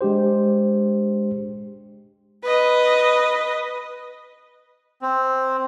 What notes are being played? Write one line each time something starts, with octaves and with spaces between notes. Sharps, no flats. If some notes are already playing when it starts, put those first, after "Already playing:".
G#3 D4 G4 C5
B4 D#5
C4